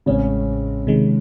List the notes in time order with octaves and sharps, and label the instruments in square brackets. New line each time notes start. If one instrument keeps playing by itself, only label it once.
[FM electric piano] A1 A2 G#3 C4 [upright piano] C#3 C#4
[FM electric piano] C3 D#3 G#3